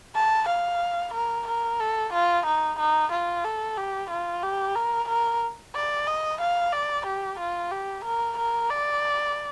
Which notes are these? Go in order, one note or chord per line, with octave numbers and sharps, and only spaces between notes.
A5
F5
A#4
A#4
A4
F4
D#4
D#4
F4
A4
G4
F4
G4
A#4
A#4
D5
D#5
F5
D5
G4
F4
G4
A#4
A#4
D5